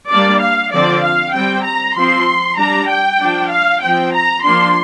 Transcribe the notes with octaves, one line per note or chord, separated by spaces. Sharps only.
G3 A#3 D4 D5
F5
D3 F3 C4 D5
F5
G3 C4 G5
A#5
F3 C4 C6
G3 D4 A#5
G5
F3 D4
F5
F3 C4 G5
A#5
F3 A#3 D4 C6